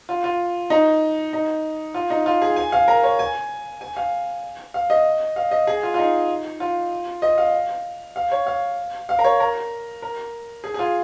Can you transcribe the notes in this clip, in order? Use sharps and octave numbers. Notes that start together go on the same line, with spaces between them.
F4
F4
D#4
D#4
F4
D#4
F4
G#4
G#5
F5
A#4
C#5
G#5
G#5
F5
F5
D#5
F5
D#5
G#4
F4
F4
D#4
F4
D#5
F5
F5
C#5
F5
F5
A#4
C#5
A#4
A#4
G#4
G#4
F4